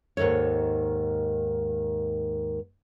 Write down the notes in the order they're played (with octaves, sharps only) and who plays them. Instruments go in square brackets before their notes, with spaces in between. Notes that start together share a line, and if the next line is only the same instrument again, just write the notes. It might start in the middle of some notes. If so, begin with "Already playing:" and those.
[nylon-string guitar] D#2 G#2 D#3 A4 C#5